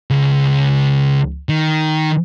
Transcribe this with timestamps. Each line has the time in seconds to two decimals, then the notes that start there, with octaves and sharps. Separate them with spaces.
0.10 C#2
1.49 D#3